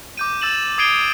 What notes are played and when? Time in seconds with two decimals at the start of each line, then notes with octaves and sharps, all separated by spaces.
0.18 D6 G6 D#7
0.41 E6 A6 E7 F#7
0.78 D#6 G#6 C7 D7 D#7 G7